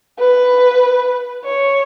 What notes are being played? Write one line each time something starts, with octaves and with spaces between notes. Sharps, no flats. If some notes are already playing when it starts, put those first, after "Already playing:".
B4
C#5